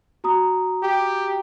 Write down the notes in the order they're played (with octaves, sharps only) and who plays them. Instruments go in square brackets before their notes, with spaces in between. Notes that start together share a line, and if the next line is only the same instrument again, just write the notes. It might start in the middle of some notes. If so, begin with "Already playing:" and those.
[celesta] F#4 A#5 D#6
[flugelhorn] G4